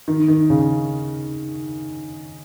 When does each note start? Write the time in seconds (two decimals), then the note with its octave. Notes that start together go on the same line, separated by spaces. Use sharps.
0.08 D#3
0.28 D#3
0.50 C#3